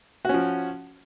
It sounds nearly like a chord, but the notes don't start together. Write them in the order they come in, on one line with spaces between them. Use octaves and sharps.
F#4 C#4 F3